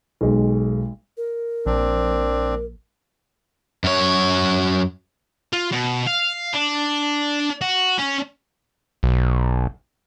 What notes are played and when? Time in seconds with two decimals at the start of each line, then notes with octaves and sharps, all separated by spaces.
0.21 B1 G#3
1.17 A#4
1.66 A#1 C4 D4
3.84 F#2 C#5
5.53 F4
5.71 B2
6.07 F5
6.53 D4
7.61 F#4
7.98 C#4
9.03 B1